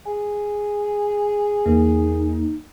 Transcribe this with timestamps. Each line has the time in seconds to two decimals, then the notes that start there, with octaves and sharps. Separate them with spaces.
0.06 G#4
1.66 E2 A#3 D#4